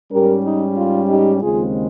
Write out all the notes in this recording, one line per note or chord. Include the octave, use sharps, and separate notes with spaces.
G#2 G3 C#4 G4 A#4
D#4
F4
D#4 G4
D#2 C#3 G#3 C4 F4 G#4